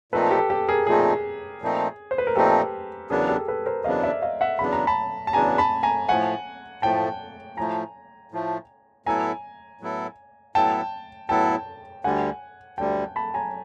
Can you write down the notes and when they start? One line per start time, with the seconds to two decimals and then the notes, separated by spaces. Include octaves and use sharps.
0.12 A#2 F3 A3 C4 D#4 A4 B4
0.31 G4 A4
0.50 G4 A4
0.68 G#4 A#4
0.87 A#2 F3 A3 C4 D#4 G#4
1.62 A#2 F3 A3 C4 D#4
2.11 C5
2.18 B4
2.27 A#4
2.35 A#2 F3 A3 C4 D#4 G4 A4
3.10 E2 C#3 F#3 B3 D4 G#4 A#4
3.29 G4 A4
3.48 A4 B4
3.66 A#4 C5
3.84 E2 C#3 F#3 B3 D4 D#5 F5
4.03 D5 E5
4.22 D#5 F5
4.41 E5 F#5
4.59 E2 C#3 F#3 B3 D4 B5
4.73 A#5
4.87 A5 B5
5.27 A5
5.33 E2 C#3 F#3 B3 D4 G#5 A#5
5.58 A5 B5
5.83 G#5 A#5
6.08 A2 F3 A3 F#5 G#5
6.82 A2 F3 A3 G5 A5
7.57 A2 F3 A3 G#5 A#5
8.32 A2 F3 A3
9.06 A2 F#3 B3 E4 A4 G#5 A#5
9.81 A2 F#3 B3 E4 A4
10.55 A2 F#3 B3 E4 A4 G5 A5
11.29 A2 F#3 B3 E4 A4 G5 A5
12.04 D2 D3 G3 F#5 G#5
12.78 D2 D3 G3 G5 A5
13.16 A5 B5
13.34 G#5 A#5